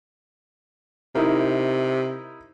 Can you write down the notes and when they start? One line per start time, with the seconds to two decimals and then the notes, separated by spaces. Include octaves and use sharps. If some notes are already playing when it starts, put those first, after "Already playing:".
1.15 C3 D#4 E4 A#4